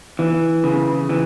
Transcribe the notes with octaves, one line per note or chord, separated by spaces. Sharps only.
E3
C#3
E3